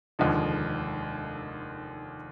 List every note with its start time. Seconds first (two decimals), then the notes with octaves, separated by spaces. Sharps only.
0.19 F1 D#2 D3 F3 G#3